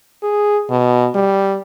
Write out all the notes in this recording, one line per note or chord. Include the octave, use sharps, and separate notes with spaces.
G#4
B2
G3